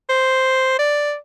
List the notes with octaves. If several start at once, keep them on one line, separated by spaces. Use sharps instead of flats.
C5
D5